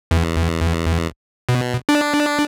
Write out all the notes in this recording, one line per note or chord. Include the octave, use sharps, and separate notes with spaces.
E2
B2
D4